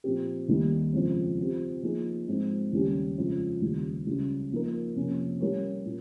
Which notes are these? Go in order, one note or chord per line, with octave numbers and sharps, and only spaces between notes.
A#2 F3 C4 G4
D#2 D#3 G3 A#3
F2 C#3 G#3 C4
F3 C4 G4
F3 A#3 D#4 G#4
G#2 F3 G#3 C4 D#4
D#2 C#3 G3 C#4 G4
F2 C#3 F3 G#3
D#2 C#3 G3
C#2 C#3 G3
F3 A#3 D#4 A#4
F2 C3 F3 A#3 C#4
G3 C#4 G4 A#4 C#5
A#2